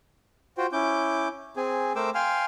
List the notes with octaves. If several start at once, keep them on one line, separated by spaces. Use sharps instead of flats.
F4 F#4 C5 G5
C#4 E4 D6 G6
C4 G#4 G#5
A3 A#4 C5 G5 D6 E6
F5 G5 G#5 C6 F6